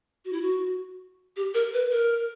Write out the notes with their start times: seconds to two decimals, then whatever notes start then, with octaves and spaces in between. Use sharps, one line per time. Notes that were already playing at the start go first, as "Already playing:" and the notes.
0.25 F#4
0.33 E4
0.42 F#4
1.36 G4
1.54 A#4
1.74 B4
1.92 A#4